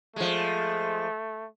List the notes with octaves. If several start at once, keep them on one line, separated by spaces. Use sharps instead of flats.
F3 G#3 A3